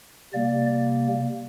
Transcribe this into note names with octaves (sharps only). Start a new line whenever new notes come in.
C3 G3 A#3 D5